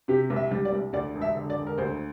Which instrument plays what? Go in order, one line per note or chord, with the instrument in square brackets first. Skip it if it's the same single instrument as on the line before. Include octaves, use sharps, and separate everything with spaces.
[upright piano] C3 G4
C2
E5
G3
D5
C2
D2 D5
E1
E5
D3
D5
E1
A#4
D2 C5